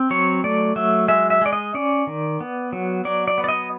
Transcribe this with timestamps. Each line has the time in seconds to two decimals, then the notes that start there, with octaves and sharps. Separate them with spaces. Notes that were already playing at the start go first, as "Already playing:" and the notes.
Already playing: C4
0.10 F#3 C#5
0.44 A3 D5
0.76 F#3 E5
1.08 G#3 E5
1.30 E5
1.41 G#3 D5
1.53 D#5
1.74 C#4 D5
2.07 D#3
2.41 B3
2.73 F#3
3.05 F#3 D5
3.28 D5
3.38 B3
3.44 D5
3.49 D#5